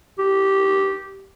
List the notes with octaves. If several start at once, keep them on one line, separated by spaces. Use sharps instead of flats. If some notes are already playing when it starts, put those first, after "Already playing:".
G4